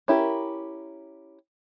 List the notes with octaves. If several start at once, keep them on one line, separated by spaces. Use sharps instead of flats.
C#4 E4 G4 A#4